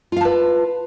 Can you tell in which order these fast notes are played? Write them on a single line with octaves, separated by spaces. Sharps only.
F4 F5 A5 B4